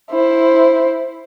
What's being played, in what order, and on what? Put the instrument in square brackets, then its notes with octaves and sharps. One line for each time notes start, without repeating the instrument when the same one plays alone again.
[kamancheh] E4 C5